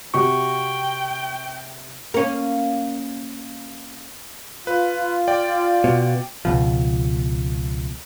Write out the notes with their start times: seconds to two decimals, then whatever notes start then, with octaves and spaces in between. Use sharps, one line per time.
0.14 C3 F#4 G4 G5 C#6
2.14 A#3 C#4
4.67 F4 B4
5.28 D5 G5
5.84 B2
6.45 C#2 B2 F3